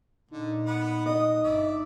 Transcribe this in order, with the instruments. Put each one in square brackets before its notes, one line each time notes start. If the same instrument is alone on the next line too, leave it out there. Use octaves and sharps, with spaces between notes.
[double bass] A#2 [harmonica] D3 [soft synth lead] D#4
[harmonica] B3 B4 F#5
[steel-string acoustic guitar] D#5 [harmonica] D#6
[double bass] G1 [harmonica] D5 E5